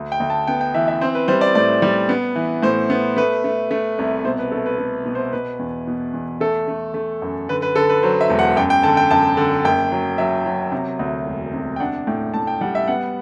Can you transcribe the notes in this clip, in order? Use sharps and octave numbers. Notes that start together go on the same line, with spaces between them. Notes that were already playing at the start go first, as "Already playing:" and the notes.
Already playing: D2
G5
D2
A5
B3 G5
G5
E3 E5
E5
C4 C5
B4
G3 C5
D5
A2 D5
G3
B3
E3
A2 C5
B3
A3 B4
A3
A3
C2
B2 C5
B4
A3 A4
B4
A3
B2
C5
B2 B4
E2
B2
E2
A3 A4
A3
A3
F#2
D3 B4
B4
D3 A4
B4
F#3 C5
E5
E1
F#5
F#2 G5
G5
D3 A5
G5
F#2 A5
D3
F#1 G5
F#3
F#3 E5
F#3
C3
D2
E1
C3
G5
D4 F#5
A2 G5
A2 A5
G5
G3 F#5
E5
B3 F#5